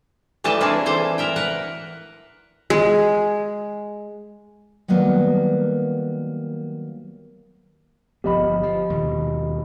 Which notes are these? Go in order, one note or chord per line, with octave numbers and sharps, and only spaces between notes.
E3 G3 A3 D#5 A5
A#3 C4 D4 E4 G#4 A5
E3 A4 C5
A#4 E5 G5
A#4 B4 F#5
G#3
D#3 F#3 G3 A#3 B3
G1 F3 B3 G4 D#5 B5
F3
D#2 B2